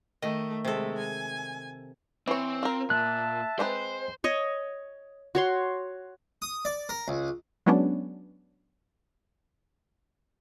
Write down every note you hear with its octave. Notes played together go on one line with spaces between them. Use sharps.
D#3 A3 D#5
C3 G#3 A3 A4
G#5
E3 C4 C#5
F4 A#4
A#2 E5 A5 F#6
G#3 C4 B4 C5
C#5 D#5
F#4 C#5 C6
D#6
D5
A#4
C#2
F#3 G#3 B3 C#4 D4